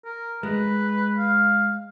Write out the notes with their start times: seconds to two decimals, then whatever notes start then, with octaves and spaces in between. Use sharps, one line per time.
0.05 A#4
0.43 G#3 D#4 B4
1.18 F5